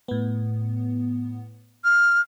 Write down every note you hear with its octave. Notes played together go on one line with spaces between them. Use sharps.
A2 B3
F6